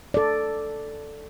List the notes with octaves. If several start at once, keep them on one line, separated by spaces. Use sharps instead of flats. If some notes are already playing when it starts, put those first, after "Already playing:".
A4 D5